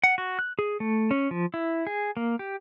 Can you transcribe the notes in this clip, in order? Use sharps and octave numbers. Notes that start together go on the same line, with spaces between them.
F#5
F#4
F#6
G#4
A3
C#4
F3
E4
G#4
A#3
G4